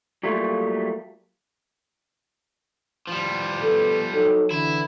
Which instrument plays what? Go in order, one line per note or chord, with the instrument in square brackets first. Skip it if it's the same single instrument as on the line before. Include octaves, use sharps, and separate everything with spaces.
[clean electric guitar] F#3 G3 A3 A#3 F4
[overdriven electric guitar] F3 G3
[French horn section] B3 A4
F#3 D#4 A4
[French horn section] D3 E3 [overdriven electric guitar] E4